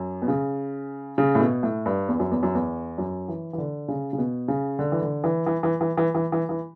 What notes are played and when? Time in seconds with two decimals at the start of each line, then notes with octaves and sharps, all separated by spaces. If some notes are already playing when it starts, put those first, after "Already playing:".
Already playing: F#2
0.22 B2
0.28 C#3
1.18 C#3
1.35 A2
1.41 B2
1.63 A2
1.86 G2
2.08 E2
2.20 F#2
2.31 E2
2.43 F#2
2.55 E2
2.98 F#2
3.28 E3
3.53 E3
3.58 D3
3.88 C#3
4.13 C#3
4.18 B2
4.48 C#3
4.79 D3
4.92 E3
5.02 D3
5.24 E3
5.47 E3
5.63 E3
5.81 E3
5.98 E3
6.15 E3
6.32 E3
6.49 E3